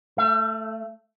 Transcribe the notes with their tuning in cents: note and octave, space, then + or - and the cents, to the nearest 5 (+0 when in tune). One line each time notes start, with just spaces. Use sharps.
A3 +0 E5 +45